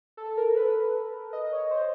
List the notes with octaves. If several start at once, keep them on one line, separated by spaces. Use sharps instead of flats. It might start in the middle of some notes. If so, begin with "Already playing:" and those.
A4
A#4
B4
D#5
C#5
C5